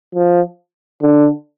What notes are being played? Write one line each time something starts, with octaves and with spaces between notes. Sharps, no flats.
F3
D3